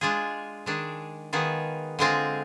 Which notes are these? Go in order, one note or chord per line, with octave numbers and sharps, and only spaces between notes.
G#3 D4 F4 G#4
D#3 G#3 D4 G#4
D#3 B3 F4 G#4
D3 G#3 C4 F4 G#4